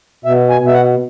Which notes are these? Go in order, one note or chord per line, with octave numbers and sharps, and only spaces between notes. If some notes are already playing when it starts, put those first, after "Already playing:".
B2 E5
G#5
B2
E5
F#5